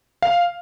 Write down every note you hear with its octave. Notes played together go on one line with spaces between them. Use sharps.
F5